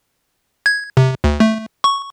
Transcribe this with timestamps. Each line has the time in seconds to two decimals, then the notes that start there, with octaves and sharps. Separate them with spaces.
0.66 G#6
0.97 C3
1.24 D2
1.40 A3
1.84 C#6